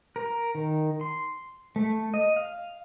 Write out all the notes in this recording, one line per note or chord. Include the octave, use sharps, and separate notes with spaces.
A#4
D#3
C6
A3
D#5
F5